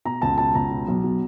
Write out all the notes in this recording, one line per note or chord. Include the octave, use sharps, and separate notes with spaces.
B2 A#5
C#2 A5
B2 A5
C#2 A#5
B2
B1
B2